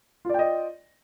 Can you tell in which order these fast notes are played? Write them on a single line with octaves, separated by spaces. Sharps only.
F4 D5 G5 D#5